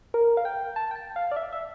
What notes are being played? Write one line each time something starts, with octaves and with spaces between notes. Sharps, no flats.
A#4
F5
G5
A5
G5
A5
F5
D5
E5
E5